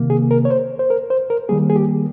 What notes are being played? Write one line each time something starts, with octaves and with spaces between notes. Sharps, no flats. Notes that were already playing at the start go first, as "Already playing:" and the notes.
Already playing: C3 D#3 A#3
G#4
A#4
C#5
C5
C5
A#4
C5
A#4
D#3 G3 A#3 G#4
G#4
G4